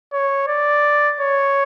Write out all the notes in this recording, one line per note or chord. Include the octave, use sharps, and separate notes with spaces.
C#5
D5
C#5